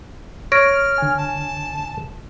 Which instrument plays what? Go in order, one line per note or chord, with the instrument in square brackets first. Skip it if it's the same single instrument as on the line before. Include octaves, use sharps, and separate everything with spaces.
[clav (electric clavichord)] C#5 [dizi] F6 [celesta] A#6 D7
[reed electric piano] D3 G#5
[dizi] A5